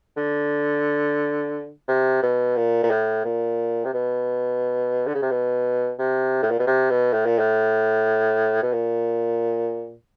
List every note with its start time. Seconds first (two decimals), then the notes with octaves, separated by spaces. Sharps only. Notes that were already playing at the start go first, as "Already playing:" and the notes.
0.17 D3
1.88 C3
2.23 B2
2.56 A#2
2.83 A#2
2.90 A2
3.25 A#2
3.85 C3
3.93 B2
5.07 D3
5.14 C#3
5.22 C3
5.31 B2
5.99 C3
6.43 A2
6.51 A#2
6.59 B2
6.67 C3
6.90 B2
7.13 A2
7.26 A#2
7.39 A2
8.63 B2
8.73 A#2